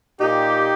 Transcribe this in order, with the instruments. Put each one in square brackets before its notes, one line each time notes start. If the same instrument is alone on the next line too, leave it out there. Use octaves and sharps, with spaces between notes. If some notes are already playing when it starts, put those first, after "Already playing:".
[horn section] A#2 D#4 G4